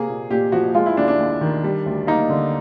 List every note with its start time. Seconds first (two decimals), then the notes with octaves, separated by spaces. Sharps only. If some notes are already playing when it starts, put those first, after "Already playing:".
Already playing: C3 A#3 G#4
0.08 A#2
0.30 A#2 G4
0.52 F3 F#4
0.74 G#3 F4
0.86 E4
0.96 D#2 D4
1.08 D4
1.19 D#2
1.41 D#3
1.64 G3
1.86 D2
2.07 A#3 D#4
2.30 D3